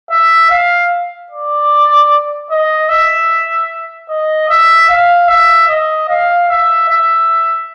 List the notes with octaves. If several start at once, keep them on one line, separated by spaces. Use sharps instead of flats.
E5
F5
D5
D#5
E5
D#5
E5
F5
E5
D#5
F5
E5
E5